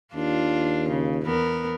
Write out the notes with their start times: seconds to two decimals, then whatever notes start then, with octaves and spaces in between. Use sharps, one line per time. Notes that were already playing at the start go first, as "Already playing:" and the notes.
0.14 D#2 D4 F4
0.89 C#3
1.26 E2 B3 A#4